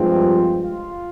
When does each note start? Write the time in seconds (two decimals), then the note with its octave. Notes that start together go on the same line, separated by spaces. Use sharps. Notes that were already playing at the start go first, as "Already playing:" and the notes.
Already playing: G2 F3 G#3 C4
0.59 F4